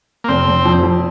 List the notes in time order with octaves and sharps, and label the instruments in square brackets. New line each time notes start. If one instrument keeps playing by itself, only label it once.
[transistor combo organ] A#3
[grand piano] F1 [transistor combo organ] C4
[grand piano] F1
F2
F2